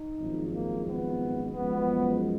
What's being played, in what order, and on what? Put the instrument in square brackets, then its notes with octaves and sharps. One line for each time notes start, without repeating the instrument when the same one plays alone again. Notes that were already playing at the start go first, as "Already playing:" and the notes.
Already playing: [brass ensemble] D#4
G#1 F#2 F3 G#3
A#3
B3
F#2 F3 G#3 B3